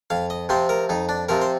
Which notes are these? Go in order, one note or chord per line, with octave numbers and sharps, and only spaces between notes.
F2 F5
D#5
C3 F3 C4 C5
A#4
F2 D#4
D4
C3 F3 C4 A#4
C5